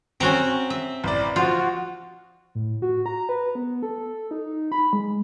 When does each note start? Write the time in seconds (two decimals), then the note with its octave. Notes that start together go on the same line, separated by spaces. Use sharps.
0.20 C4 C#4 F#4 A#5
0.70 E5
1.04 A1 D5
1.36 F3 F4 F#4
2.55 A2
2.82 F#4
3.06 A#5
3.29 B4
3.55 B3
3.83 A4
4.31 D#4
4.72 B5
4.93 G#3